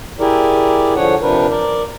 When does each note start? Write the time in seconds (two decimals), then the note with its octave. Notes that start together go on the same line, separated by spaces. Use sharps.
0.20 E4 G4 G#4 A#4 D5
0.96 D3 F3 D4 C#5 F#5
1.22 C3 F3 D4 A#4 B4
1.50 A#4 D5